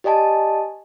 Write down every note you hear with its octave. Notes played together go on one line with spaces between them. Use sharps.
G4 D5 D#5 G#5 A5